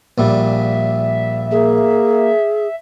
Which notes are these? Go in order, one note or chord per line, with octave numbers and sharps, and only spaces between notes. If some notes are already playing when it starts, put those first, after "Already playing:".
A#1 A#2 G3 E5
A#3 G#4